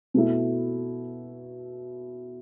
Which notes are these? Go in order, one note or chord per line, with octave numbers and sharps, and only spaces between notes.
B2 A3 E4